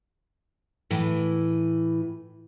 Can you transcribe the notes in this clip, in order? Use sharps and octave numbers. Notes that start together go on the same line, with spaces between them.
A2 E3